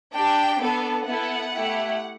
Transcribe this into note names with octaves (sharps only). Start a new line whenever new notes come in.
D4 G4 G5
B3 D4 A4
B3 E4 A4 F#5
A3 E4 G4